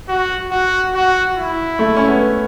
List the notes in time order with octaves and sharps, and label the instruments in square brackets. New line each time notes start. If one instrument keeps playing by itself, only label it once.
[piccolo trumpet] F#4
F#4
F#4
E4
[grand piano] A3
C#4
B3